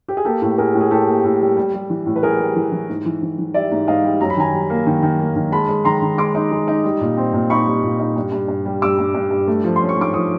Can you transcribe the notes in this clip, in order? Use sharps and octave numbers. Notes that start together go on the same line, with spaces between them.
G4
G#4
A#3 G4 A4
A2
A2 G#4 A#4
A2
G#4
A2 G4 A4
A#3
A2
G3
G3
G3
E3
A2
B4
G3 G#4 A#4
G3
E3
E3
G#2
E3
E3
E3
G3 D5 E5
G#2
G#2 D#5 F5
G3
F#2 A#5
B5
D#3 G#5 A#5
G3
A#3
D#3
D#3
A#3
D#3
G#3 A5 B5
G#3
D#3 A#5 C6
D#3
G#3 C6 D6
D#4
G#3
D#4
G3
A#2
C4
A#2
D#4 B5 C#6
G3
A#2
D#4
G2
G2
G2
G3
G2 D6 E6
G2
G2
G2
A3
F3
C#4 C6
C#6
G#2 D6
F3 C#6 D#6